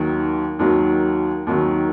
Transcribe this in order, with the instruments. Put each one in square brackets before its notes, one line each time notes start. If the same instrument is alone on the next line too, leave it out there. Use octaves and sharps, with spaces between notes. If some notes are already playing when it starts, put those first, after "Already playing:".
Already playing: [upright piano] D#2 D#3 F#3
D#2 D#3 F#3
D#2 D#3 F#3